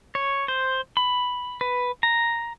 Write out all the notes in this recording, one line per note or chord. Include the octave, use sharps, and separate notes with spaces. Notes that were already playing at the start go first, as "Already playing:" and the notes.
C#5
C5
B5
B4
A#5